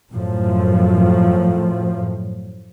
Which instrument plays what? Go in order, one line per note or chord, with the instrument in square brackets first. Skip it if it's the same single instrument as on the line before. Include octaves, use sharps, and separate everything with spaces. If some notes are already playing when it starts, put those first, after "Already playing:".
[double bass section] F#2 A2 F3